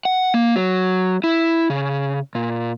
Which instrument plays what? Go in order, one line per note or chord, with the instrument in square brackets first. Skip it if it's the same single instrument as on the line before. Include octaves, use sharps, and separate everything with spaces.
[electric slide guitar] F#5
A#3
F#3
E4
C#3
A#2